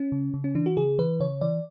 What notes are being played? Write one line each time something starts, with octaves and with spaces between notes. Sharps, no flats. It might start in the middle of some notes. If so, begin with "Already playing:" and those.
Already playing: C#4
C#3
C#3
C#4
E3 D4
F#4
C#3 G#4
E3 B4
C#3 C#5
E3 D5